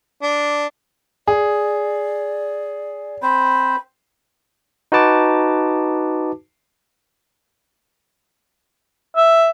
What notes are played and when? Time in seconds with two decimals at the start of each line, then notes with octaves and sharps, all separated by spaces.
0.22 D4
1.28 G#4 D5
3.22 C4 C5 B5
4.92 D#4 F#4 B4 A5 D6
9.16 E5